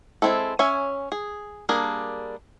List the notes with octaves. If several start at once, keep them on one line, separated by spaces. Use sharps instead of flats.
G#3 C4 E4 A4
C#4 C#5 E5 G#5
G#4
G3 A#3 D4 G#4 A#4